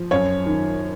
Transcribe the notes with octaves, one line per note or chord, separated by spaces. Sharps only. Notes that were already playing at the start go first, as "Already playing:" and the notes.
Already playing: F3
F#2 C#5
D#3